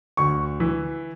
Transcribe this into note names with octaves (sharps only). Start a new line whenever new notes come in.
D2 C#6
E3